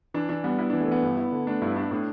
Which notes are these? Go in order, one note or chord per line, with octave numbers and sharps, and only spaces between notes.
E3 D4
E3 D4
G3 B3
B3 E4
E3 D4
A3
E3 B3
G2
E4
D3
A3 D4
G2 E4
D4 E4
A2 D4